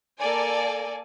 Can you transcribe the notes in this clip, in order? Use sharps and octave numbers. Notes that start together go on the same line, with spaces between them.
A#3 A4 D5 G#5